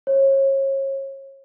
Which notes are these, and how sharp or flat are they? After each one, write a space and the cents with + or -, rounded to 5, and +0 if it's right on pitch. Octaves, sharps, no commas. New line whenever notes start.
C#5 -35